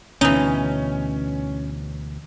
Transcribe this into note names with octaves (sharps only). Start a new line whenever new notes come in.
D2 B2 E3 C#4 D#4